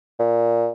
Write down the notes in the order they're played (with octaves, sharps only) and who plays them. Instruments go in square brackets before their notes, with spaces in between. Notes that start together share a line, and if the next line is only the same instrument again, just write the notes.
[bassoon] A#2